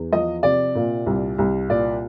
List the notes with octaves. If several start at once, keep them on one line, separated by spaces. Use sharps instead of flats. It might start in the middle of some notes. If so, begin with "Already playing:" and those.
Already playing: E2
F3 D#5
C3 D5
A#2
C2
C2
A#2 D5